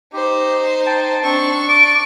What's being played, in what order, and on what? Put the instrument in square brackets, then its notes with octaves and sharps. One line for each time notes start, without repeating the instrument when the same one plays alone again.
[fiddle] D#4 C5 [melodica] G4
[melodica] G5 A5
[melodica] C4 [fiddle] D4 C#6
[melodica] D5 [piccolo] D7